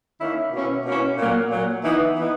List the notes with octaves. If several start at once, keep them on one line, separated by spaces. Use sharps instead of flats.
D#3 A#3 C#4 E4
B2 A#3 C#4 E4
B2 A#3 C#4 E4
A#2 F#3 A#3
A#2 F#3 A#3
E3 B3 D#4
E3 B3 D#4